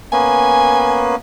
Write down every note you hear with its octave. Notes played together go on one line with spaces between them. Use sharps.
A#3 B3 C#4 G#5